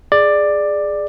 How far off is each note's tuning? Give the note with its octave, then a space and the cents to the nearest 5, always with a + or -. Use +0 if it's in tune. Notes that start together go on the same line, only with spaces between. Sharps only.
G#4 +0 D5 +10